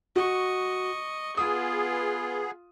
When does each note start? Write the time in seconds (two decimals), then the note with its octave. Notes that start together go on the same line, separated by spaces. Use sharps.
0.16 F#4 D#5 C#6
1.37 B3 F4 G#4 D#6